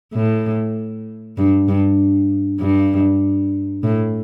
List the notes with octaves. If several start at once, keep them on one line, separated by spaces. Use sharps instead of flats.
A2
G2
G2
G2
A2